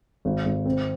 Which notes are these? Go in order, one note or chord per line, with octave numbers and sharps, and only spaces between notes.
G#1
G#1
C4